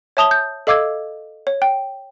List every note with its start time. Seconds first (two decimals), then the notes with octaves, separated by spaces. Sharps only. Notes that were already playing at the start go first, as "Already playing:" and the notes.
0.17 C#5 E5 A5 D#6 F7 G7
0.31 G6
0.67 A4 D#5 F5 D6 E6 G#6
1.47 C#5
1.62 G5